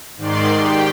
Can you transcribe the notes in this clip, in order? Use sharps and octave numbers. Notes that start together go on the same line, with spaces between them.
G#2 D#3 D5 C6
G4 G5